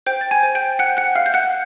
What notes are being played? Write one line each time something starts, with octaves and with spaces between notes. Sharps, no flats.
C5 G5 G6
A6
G#5 G#6
C5
G5 G6
F#5 G5 F#6
F#5 F#6
E5 F5 F6
G6
F#5 F#6